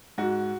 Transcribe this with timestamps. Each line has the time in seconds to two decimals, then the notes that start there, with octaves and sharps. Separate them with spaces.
0.18 G#2 F#4